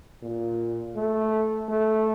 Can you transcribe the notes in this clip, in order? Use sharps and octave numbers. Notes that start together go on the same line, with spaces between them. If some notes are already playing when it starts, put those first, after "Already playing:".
A#2
A3
A3